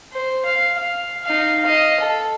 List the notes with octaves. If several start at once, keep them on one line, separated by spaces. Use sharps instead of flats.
C5
F5
F5
D#4 F5
D#5 F5
A4